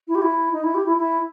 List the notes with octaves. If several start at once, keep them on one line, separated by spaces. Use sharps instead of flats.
E4
G4
E4
D#4
E4
G4
E4
E4